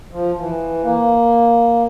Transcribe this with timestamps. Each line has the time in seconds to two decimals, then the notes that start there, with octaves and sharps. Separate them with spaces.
0.11 F3
0.38 E3
0.83 A#3